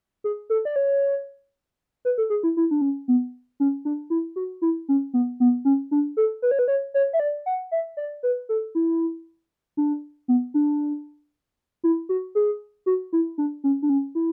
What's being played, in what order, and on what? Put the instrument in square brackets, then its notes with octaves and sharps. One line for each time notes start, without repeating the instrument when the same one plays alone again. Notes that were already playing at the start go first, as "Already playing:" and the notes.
[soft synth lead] G#4
A4
D5
C#5
B4
A4
G#4
E4
E4
D4
C#4
B3
C#4
D4
E4
F#4
E4
C#4
B3
B3
C#4
D4
A4
B4
C#5
B4
C#5
C#5
E5
D5
F#5
E5
D5
B4
A4
E4
D4
B3
D4
E4
F#4
G#4
F#4
E4
D4
C#4
D4
C#4
E4